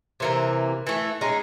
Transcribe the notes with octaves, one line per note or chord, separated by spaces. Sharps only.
C3 E3 A#3
E3 A3
G#3 C#4 D#4